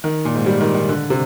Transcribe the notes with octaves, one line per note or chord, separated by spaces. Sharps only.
D#3
A#2
G#2
G3
D#3
D#3
D3
C3